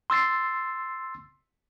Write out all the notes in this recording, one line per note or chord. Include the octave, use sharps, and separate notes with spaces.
C6 E6 A6 C7